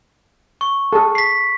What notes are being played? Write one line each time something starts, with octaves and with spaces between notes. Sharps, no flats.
C#6
G#4 A4
B6 C7